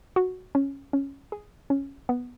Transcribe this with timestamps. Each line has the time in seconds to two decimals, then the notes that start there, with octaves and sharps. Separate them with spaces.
0.16 F#4
0.55 C#4
0.93 C#4
1.32 G#4
1.70 C#4
2.09 B3